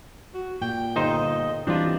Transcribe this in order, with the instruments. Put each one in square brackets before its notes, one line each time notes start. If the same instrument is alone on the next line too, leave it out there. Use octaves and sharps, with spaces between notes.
[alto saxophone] F#4
[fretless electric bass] A#2 [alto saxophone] G5
[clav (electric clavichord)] G1 D#4 C5 [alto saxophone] D#5
[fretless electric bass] E3 G3 [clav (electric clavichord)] C4 F4 [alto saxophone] D4